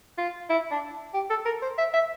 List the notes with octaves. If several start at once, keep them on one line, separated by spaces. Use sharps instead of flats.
F4
E4
D4
G4
A4
A#4
C5
E5
E5